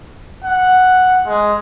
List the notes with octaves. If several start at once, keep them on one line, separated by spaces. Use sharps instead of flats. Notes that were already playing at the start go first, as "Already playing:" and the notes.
F#5
G#3